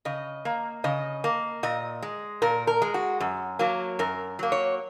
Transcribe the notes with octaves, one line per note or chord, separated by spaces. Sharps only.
C#3 D#5
A#3
C#3 D#5
A#3
A#2 D#5
G#3
A#2 A#4
A#4
G#3
F#4
F#2
F#3 A#3
F#2 A#4
F#3 A#3
C#5